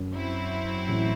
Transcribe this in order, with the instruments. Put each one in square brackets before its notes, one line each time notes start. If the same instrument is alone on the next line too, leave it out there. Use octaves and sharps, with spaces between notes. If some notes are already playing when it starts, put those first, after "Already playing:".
Already playing: [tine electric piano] F#2
[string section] F#3 C4 E4
[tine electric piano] A1 A2